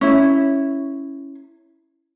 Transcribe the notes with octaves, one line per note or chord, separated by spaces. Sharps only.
C#4 E4